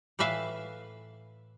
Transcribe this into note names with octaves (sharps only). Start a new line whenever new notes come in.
A2 E3 B4 E5 F5